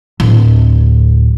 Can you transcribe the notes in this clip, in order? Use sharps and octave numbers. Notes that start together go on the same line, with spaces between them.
D1